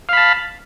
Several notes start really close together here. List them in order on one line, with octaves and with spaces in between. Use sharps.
F5 B5 A5